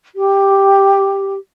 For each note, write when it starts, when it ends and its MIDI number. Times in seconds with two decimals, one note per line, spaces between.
0.15 1.34 67